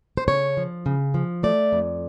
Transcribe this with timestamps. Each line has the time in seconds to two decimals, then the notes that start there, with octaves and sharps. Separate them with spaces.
0.17 C5
0.28 C#3 C#5
0.57 F3
0.86 C#3
1.14 F3
1.43 A3 D5
1.72 F2